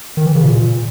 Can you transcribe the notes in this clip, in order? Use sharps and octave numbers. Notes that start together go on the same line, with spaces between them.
D#3
E3
C#3
A#2